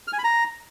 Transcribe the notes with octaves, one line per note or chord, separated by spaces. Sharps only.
F6
G#5
B5
A#5